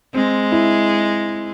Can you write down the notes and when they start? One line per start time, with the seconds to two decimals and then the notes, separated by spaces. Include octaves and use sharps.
0.14 G#3 C4
0.52 E4